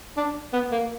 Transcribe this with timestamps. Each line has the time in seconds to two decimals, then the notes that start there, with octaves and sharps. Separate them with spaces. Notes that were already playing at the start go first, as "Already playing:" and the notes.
0.17 D4
0.53 B3
0.72 A#3